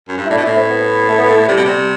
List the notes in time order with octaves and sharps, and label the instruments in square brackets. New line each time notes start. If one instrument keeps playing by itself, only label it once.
[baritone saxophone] F#2
G2
[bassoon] E4
[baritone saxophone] A2 [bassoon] D4
[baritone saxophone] B2
[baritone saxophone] A2 [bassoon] E4
[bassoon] C4
B3
A3
B3
A3
[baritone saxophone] C3 [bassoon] G3
[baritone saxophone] B2
[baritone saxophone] C3 [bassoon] G3